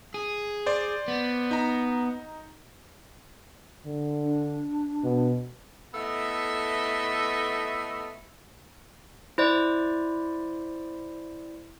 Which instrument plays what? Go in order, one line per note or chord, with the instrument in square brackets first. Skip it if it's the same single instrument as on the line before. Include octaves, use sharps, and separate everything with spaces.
[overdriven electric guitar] G#4
[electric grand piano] C5 D5
[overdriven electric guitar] B3
[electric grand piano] D#4 A#5
[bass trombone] D3
[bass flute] D4
[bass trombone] B2
[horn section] A3 B3 E4 A4 D#5 E5
[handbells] E4 C5 D5